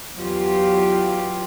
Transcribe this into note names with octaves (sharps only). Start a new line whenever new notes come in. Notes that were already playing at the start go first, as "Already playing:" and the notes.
E2 F#3 F4 G4